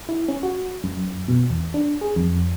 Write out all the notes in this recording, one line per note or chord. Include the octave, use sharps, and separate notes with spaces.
E4
C#4
F#4
F#2
B2
E2
D4
G#4
F2